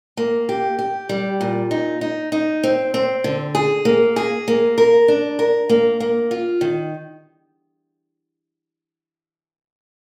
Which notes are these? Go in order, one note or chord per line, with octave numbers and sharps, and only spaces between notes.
A#3
G4
G4
G3
A#2
D#4
D#4
D#4
C4
C4
D3
G#4
A#3
G#4
A#3
A#4
D4
A#4
A#3
A#3
F4
D#3